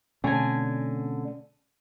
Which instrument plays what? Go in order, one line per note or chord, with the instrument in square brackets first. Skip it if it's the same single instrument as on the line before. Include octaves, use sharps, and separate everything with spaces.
[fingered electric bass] B2 A3 C4 [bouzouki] D3 G#5 [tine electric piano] C#4